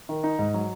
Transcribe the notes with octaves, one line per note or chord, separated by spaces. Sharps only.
D#3
D#4
G#2
F#3